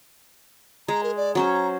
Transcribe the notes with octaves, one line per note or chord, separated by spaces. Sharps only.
G#3 A#5
A#4
D5
F#3 C#4 C5 A#5